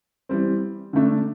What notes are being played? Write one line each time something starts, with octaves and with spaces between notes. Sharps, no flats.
E3 G3 C4
D3 A3 D4